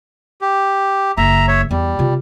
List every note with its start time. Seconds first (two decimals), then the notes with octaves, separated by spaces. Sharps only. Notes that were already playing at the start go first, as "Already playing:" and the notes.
0.41 G4
1.17 F#1 E5 A#5
1.48 C#5 E5
1.71 E2 G3
1.99 C3 F4